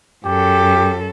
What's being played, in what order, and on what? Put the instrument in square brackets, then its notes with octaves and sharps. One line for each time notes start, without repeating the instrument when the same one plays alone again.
[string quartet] F#2 A4 [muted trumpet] G4